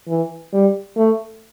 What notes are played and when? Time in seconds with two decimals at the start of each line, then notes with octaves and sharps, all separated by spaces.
0.08 E3
0.53 G3
0.97 A3